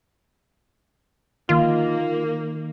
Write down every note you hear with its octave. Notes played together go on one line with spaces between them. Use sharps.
D#3 A#3 F4